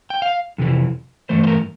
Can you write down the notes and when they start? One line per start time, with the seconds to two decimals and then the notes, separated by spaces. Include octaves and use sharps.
0.10 G5
0.22 F5
0.58 F2 C3 E3
1.29 G2 E3 A3 C5
1.43 C5
1.47 A#4